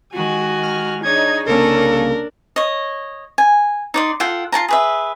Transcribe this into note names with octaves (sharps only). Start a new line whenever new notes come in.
D#3 G#3 F#4 G#5
F6
D4 D#4 G#4 C#5 D#5 G#6
C2 C#3 A#3 C#4 D4 A4 A#4
C#5 D#5
G#5
D#4 D5 C6
F4 A4 F#5 G5
F4 F#4 A5 A#5
G#4 B4 E5